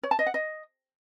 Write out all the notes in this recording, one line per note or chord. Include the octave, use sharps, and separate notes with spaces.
C#5
A5
D#5
F#5
D#5